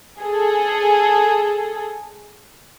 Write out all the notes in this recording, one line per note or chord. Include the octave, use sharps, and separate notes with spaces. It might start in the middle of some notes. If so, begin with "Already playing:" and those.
G#4 A4